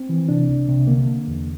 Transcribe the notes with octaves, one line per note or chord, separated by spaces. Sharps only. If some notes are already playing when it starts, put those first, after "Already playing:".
Already playing: C4
E3
C3 D4
C2
C3
D3 A#3
D3
E2